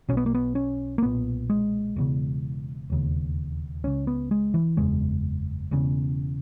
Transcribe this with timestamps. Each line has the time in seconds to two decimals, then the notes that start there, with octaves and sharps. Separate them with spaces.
0.09 B1 B2 C#4
0.17 B3
0.26 A#3
0.35 B3
0.55 C#4
0.98 A#3
1.02 B1 A#2 B3
1.50 G#3
1.96 E1 E2 C#3
2.90 E1 D#2 C#3
3.84 C#2 C#3 C#4
4.07 B3
4.31 G#3
4.54 E3
4.77 F#1 E2 C#3 G#3
5.71 E1 E2 C#3